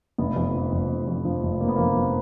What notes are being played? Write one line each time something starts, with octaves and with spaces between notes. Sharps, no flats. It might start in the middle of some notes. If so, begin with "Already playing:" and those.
F1 B3
F2
F3
F1
F1
F2
F3
F1
F1 A#3
B3
F2 A#3
F3